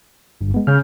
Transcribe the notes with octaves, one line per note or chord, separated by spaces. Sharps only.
G1 G2
G#3 B3
C#3 F6 G6